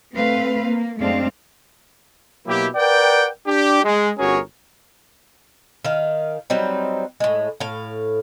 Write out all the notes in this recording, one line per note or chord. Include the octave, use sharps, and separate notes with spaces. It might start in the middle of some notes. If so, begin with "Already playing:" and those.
A3 C4 B4 F5
A#3
F#2 G#3 A3 C4 D4 F5
B2 F#3 A#3 E4 G4
A#4 B4 D5 F#5 G5
D4 G4
G#3
G1 C#4 F#4 G#4 A#4 C#5
D#3 F5
F#3 G3 C4 D#4
A2 G#3
A2 F5